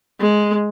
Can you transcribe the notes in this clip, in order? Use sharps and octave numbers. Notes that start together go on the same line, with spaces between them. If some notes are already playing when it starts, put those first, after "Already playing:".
G#3